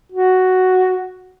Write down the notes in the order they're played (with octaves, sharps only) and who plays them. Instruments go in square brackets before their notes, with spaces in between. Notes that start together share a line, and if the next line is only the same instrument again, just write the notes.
[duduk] F#4